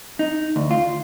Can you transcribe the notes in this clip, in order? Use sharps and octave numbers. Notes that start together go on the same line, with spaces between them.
D#4
D2
F4